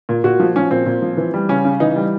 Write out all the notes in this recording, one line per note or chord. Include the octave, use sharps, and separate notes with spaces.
A#2
A#2 F#4
F3
F3 C#4
A#2 C4
A#2
F3
E3
G3
C#3 C#4
C#3
E3 D#4
G3